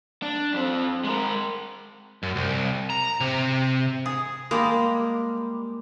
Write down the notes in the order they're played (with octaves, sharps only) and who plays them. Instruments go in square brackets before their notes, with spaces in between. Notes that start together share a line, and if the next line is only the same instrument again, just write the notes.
[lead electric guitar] D4
F2 C4
G#3 A#4
[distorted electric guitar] F#2
C2
A#5
C3
[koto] G#4
[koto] G3 G#3 [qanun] A#3